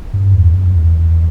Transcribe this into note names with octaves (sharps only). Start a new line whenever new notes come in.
G2
E2
F#2
E2